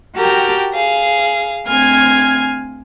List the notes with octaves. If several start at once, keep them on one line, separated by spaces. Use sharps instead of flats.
F#4 G4 A#4 G5 A5 F6
G#4 F5
D2 C4 F5 G#5 F6 G#6